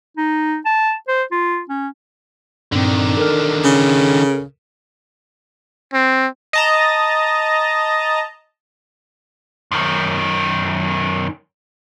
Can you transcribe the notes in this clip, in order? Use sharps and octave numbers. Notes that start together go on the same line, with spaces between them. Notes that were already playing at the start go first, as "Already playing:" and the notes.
D#4
A5
C5
F4
C#4
G2 A#2 D3 D#3 C4
A4 A#4 F6
C#3
C4
D#5 A5 A#5
F#2 D#3